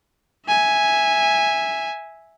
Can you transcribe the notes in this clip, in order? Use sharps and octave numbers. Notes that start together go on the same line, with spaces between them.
E5 G#5